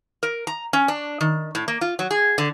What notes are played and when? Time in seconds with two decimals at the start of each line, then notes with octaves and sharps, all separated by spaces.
0.23 A#4
0.47 A#5
0.73 C#4
0.88 D4
1.21 D#3
1.55 A2
1.68 A#3
1.81 F4
1.99 F#3
2.11 G#4
2.38 D3